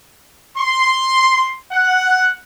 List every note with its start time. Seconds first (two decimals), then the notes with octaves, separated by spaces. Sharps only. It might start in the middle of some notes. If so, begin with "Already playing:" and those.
0.57 C6
1.71 F#5